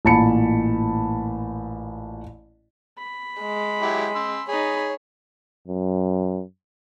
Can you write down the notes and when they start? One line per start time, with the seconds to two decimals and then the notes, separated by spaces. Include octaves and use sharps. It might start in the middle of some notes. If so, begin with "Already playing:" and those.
0.05 A1 A#2 A5 B5 C#7
2.98 B5
3.41 G#3
3.82 F#3 E4 G4
4.15 C6 E6
4.48 D#4 G#4 C#5 B5
5.68 F#2